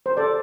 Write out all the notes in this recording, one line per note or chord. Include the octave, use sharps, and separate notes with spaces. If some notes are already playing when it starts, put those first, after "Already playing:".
C5
A4 D5